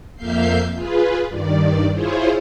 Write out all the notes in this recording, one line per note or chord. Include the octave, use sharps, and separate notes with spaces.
F2 A#3 E5 F5 G6 C7
F4 G#4 B4
G2 D#3 D5
E4 F4 G#4 C5 C#5